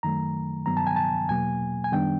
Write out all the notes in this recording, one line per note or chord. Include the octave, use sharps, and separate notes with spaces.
F#2 D#3 F#3 A3 A#5
G2 D#3 F#3 B3 A#5
A5
G#5
A5
E2 B2 F#3 A#3 G#5
G#5
F#2 D#3 G3 B3 D4 G5